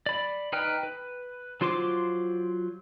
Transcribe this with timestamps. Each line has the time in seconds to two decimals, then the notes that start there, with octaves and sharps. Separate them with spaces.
0.06 D5 B5
0.53 D#4 B4 G5 F6
0.83 B4
1.61 F#3 F4 C5 C6 D6